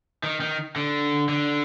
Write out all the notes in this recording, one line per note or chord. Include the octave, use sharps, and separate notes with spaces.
D#3
D#3
D3
D3